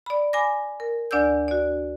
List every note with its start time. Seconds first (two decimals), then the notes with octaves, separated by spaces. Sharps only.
0.06 D5 B5
0.33 G#5 B5 D6 A#6
0.80 A#4
1.11 D2 D4 D5 G#5 E6 G6
1.48 F#4 D5